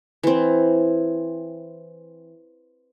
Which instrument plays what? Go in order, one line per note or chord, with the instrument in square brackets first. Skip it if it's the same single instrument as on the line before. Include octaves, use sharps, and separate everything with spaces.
[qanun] E3 C4